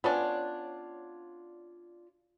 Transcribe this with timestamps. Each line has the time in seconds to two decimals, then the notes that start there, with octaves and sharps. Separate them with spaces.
0.04 B3 C#4 D4 F4 C#5 D5